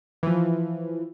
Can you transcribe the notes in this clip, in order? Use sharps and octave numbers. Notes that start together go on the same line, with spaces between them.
E3 F3